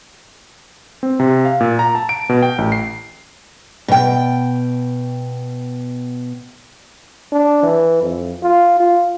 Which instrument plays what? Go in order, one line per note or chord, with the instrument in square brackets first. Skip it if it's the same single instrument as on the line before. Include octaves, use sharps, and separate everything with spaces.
[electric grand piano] C4
C3
F5
A#2
A#5
A5
D7
B2
G5
A1
C7
[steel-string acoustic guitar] B2 G5
[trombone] D4
E3
F2
F4
F4